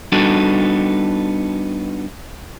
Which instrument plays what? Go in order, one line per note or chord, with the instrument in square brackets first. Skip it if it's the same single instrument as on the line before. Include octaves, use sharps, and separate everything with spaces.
[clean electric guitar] G3 B3 D4 D#4 F#4 A4